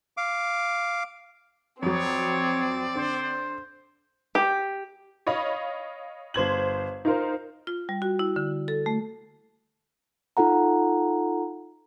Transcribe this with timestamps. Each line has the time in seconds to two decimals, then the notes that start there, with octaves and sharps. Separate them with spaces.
0.17 F5 D6
1.83 F2 F#3 C4 C#5 D5
2.95 D3 C5
4.35 G4
5.27 C#5 D#5 F5 B5
6.34 G1 C5 G#6 F#7
7.05 D#4 F4 A#4 C5
7.67 F4
7.89 G3
8.02 F#4
8.19 E4
8.36 D3
8.68 A4
8.86 A3
10.37 D#4 F4 A4 F#5 A#5